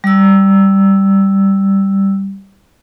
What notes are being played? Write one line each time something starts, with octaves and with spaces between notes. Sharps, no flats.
G3 E6